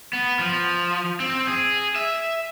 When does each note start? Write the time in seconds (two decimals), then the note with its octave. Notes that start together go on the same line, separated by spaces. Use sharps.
0.13 B3
0.39 F3
1.20 C4
1.47 G#4
1.96 E5